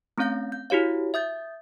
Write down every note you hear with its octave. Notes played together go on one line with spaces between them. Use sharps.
A3 C4 C#4 F5 G6 A#6
G6
E4 F#4 G4 C#5 F5
E5 D#6 G6 A6